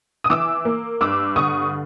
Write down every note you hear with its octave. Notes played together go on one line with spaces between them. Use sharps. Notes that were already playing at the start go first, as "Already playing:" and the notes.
D#6
E3 D6 E6
A#3
G2 D6 E6
D3 C#6 D#6